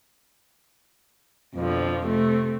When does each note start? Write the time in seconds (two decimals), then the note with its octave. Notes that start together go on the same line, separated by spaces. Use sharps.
1.56 F2 B2 D3 F3
2.05 C3 A3 C4